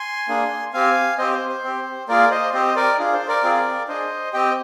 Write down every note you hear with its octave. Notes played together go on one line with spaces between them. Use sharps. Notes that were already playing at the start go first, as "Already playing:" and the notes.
Already playing: G#5 C6
A#3 D4 G#4
C4 G4 F5 G#5
C4 G4 C5 D#5
C5
C5
C4 G4
A#3 F4 G#4 A#4 D5
C5 D#5
C4 G4 C5 D#5
A#4 D5
D4 F4 G#4
C5
A#4 D5
C4 F4 G#4
D4 G#4 C5 D#5
C4 G4 D#5 G5